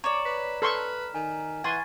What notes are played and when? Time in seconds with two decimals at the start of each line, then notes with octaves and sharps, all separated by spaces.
0.04 C#5 D5 A#5 E7
0.25 B4 B6
0.62 A4 B4 C6 C#6 F6
1.14 D#3 G#5
1.64 E3 F#5 G#5 C6 C#6 G#6 A6